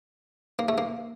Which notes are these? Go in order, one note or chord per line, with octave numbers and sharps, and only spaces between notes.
A#3
A3
A#3